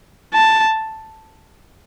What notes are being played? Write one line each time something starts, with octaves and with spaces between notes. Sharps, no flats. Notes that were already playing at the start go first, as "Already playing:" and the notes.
A5